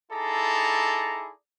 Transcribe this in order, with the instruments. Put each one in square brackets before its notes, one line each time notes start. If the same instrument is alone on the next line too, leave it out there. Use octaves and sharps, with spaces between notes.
[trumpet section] D#4 E4 G#4 A4 D5 A#5